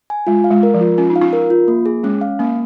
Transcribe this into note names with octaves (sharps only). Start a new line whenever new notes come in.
G#5
G#3 F4
F5
G#3
A#4
F3
F4
C#4 F4
D#4
F5
C#4 F4
A#4
F4
A#3
G#4
G#3 C#4
F5
A#3 C#4